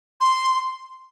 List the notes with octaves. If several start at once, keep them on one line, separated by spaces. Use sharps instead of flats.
C6